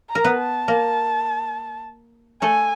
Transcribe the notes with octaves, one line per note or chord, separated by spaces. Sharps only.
A#5
A#4
B3 B4
A5
A#3 A#4
A3 A4 G#5